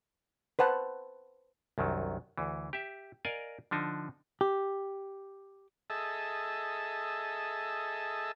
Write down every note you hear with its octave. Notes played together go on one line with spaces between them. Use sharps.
B4 C5 F#5 A5
C2 F#2 D#3 F#3
D2 E3
G4 E5
A#4 D5 D#5 F5 G#5
D3 F3 D4 D#4
G4
G#4 A4 D#5 E5 A5